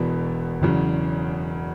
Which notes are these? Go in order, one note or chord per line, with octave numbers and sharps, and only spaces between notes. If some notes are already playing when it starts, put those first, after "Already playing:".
Already playing: E1 E2 B2 B3
E1 E2 C#3 F#3